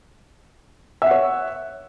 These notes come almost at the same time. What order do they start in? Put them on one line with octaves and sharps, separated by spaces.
E5 F#5 C#5